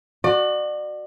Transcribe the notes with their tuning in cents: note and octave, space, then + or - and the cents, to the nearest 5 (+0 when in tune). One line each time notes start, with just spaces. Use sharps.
F#4 +0 D5 +35